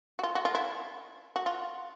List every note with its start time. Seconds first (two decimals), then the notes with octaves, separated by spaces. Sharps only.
0.19 F#4
0.23 F4
0.35 F#4
0.45 F4
0.55 E4
1.36 F#4
1.46 F4